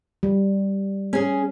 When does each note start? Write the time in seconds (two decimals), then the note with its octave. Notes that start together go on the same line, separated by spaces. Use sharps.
0.23 G3
1.13 C#4 G#4